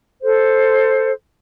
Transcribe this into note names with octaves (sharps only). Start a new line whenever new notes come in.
A4 C5